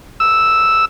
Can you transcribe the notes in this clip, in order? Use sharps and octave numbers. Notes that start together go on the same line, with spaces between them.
E6